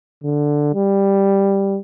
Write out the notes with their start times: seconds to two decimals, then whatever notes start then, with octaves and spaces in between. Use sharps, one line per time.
0.24 D3
0.74 G3